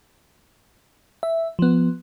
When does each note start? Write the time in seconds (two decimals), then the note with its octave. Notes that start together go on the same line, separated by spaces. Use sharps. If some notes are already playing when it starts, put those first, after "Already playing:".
1.23 E5
1.59 F3 B3